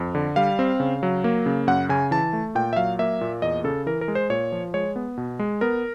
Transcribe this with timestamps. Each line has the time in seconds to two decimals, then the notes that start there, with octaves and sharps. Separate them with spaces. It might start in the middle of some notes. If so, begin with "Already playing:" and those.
Already playing: F2
0.15 D3
0.36 G3 F5
0.59 C4
0.80 C#3
1.03 F#3
1.24 A#3
1.46 C#3
1.67 F#2 F#5
1.89 C#3 G#5
2.11 E3 A5
2.33 A3
2.55 A#2 G5
2.73 E5
2.76 F#3 F5
2.99 A#3 E5
3.21 A#2
3.42 E2 D#5
3.64 C#3 A4
3.86 E3 A#4
4.01 A#4
4.08 G#3
4.15 C5
4.30 A#2 C#5
4.52 F3
4.74 G#3 C#5
4.96 B3
5.17 B2
5.39 G#3
5.61 B3 A#4